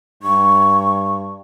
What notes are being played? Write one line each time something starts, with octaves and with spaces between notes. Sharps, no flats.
G2 C#6